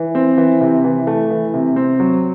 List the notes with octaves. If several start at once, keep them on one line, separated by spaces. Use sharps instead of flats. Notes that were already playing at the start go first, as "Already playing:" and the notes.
Already playing: E3
C4
E3
C3
E3
A3
E3
C3
C4
F#3